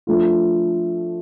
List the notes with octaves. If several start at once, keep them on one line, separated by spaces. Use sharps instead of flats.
F3 A3 D4 F4